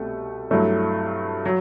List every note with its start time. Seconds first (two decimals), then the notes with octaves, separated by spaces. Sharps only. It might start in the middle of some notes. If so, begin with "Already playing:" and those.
Already playing: C2 B2 A3
0.51 G2 F#3 A3 E4
1.45 F#3